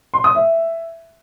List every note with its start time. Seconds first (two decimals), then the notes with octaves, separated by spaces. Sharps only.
0.14 C6
0.24 D#6
0.35 E5